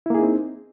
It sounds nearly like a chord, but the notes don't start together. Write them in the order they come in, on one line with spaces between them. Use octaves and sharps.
E4 A#3 G#4 D#4 C4